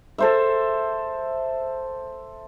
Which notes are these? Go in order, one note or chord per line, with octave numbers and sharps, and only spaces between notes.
A4 C5 E5